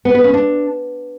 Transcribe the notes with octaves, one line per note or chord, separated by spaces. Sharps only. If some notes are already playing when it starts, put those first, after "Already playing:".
B3
B4
C#4
D4